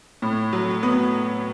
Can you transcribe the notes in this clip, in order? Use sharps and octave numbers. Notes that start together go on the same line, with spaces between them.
A2
F#3
B3